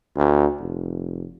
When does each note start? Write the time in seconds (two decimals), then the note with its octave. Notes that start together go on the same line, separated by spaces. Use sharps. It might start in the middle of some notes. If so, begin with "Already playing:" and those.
0.16 D2
0.59 F1